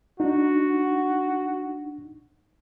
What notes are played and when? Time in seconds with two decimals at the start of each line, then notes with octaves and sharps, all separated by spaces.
0.20 D4 D#4 F#4